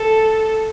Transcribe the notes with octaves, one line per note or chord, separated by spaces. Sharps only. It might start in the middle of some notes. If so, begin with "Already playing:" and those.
Already playing: A4